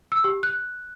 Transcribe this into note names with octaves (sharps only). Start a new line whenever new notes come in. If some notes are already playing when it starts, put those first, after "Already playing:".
E6
G4
F#6